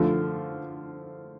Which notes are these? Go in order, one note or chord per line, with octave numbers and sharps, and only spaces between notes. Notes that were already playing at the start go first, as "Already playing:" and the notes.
Already playing: D3 F3 A3